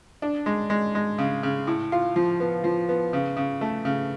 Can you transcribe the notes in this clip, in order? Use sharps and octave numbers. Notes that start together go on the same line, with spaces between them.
D4
G#3
G#3
G#3
C#3
C#3
A2
F4
F3
B3
F3
B3
C#3
C#3
A3
C#3